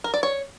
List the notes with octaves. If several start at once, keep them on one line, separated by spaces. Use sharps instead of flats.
A#4
D5
C#5